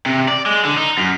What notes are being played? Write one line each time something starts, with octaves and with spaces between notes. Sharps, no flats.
C3
D5
G#3
D3
D#4
F#2